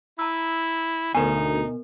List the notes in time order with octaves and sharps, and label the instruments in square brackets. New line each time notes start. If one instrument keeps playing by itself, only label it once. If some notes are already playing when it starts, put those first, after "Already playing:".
[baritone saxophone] E4 [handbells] A#5 E6
[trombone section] D2 [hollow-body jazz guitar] B2 G#5 [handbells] B3 A#4 [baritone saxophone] D#4